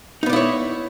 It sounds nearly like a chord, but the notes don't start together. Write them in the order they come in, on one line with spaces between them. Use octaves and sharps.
D#4 B3 D5 E4 C#5